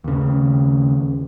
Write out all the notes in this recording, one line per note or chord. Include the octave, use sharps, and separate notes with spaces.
D#2 C#3